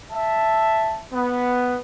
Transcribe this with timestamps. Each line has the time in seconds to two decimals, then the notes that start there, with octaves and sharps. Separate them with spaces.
0.12 E5 A5
1.13 B3